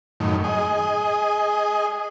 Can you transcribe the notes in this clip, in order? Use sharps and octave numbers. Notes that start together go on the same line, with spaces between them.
F#2 A2 D#3
G#4 D#5